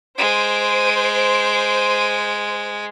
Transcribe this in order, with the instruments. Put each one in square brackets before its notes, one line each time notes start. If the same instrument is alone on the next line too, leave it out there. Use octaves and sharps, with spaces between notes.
[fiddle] G#3 [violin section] C5 D7